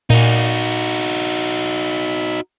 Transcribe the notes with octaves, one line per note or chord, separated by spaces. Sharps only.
A#2 D#4 F#4